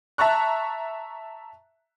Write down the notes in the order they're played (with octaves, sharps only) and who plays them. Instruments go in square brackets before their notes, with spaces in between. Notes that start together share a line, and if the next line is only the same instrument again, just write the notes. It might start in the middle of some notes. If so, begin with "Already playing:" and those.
[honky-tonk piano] E5 A5 A#5 C#6 F#6